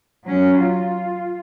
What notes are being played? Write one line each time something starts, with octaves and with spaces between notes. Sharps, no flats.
F#3 C#4
F4